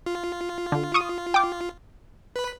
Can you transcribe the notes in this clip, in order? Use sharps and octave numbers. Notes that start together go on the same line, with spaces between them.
F4
D3
C#6 D#6 D#7
G5 D6
B4 B5